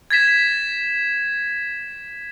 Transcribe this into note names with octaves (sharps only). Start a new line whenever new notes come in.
G#6 A6 B6 E7